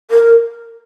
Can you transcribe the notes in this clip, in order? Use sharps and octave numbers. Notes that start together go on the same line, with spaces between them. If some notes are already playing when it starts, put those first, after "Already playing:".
A#4